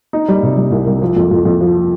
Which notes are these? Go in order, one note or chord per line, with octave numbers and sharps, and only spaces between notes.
D#4
G3
C3
G3
C2
C2
F3
F2
F2
F2
F3